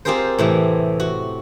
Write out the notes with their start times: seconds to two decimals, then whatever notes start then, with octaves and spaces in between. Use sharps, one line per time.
0.05 C4 F4 G4 G#4 A#4 C5
0.38 A2 C3 E3
1.00 F#4